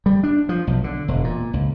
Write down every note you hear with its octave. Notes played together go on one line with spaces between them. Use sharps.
G3
D4
F3
B1
D3
E1
A#2
C#2